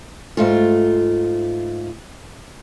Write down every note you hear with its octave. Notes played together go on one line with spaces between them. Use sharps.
G#2 A3 F4